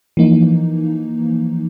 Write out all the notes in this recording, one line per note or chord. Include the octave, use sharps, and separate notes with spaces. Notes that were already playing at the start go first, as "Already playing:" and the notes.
E3 F3 A#3 D#4